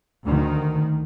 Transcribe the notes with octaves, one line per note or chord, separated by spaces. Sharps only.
D2 D#3